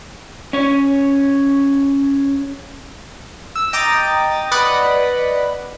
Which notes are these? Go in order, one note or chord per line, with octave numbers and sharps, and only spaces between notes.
C#4 C#5
E6
D#5 G5 A#5 D6 D#6 A6
B4 D5 D#5 F#5 B5